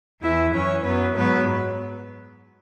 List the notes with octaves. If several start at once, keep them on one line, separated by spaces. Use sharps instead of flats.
E2 E3 E4 E5
F#2 E3 C#4 C#5
F#2 F#3 B3 B4
G#2 F#3 B3 B4